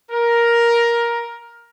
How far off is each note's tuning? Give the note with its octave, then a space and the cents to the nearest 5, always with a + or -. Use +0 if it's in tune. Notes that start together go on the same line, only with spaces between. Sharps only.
A#4 +10